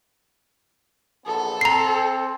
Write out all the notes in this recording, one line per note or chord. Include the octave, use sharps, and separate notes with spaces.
A#1 E2 B3 A4
C4 A#5 C7